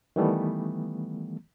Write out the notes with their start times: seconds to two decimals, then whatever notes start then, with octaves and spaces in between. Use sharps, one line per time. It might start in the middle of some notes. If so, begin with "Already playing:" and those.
0.16 D#3 E3 G3 A3 B3